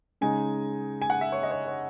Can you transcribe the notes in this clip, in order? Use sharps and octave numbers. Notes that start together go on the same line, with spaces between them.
C#3 G#3 D#4 G#5
G#5
F#5
E5
C#5
D#5
C#5
C#5